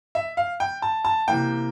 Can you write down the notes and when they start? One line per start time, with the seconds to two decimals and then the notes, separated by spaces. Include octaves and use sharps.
0.15 E5
0.37 F5
0.60 G5
0.82 A5
1.05 A5
1.28 C3 E3 A#3 G5